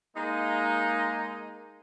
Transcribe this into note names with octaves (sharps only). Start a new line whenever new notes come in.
G#3 A#3 D#4